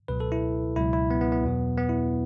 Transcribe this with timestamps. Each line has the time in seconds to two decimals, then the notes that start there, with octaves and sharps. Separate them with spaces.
0.08 C#2 B2 F#3 B4
0.20 A4
0.32 E4
0.76 C#2 B2 F#3 E4
0.93 E4
1.11 B3
1.21 B3
1.32 B3
1.44 E2 B2 F#3
1.78 B3
1.89 E4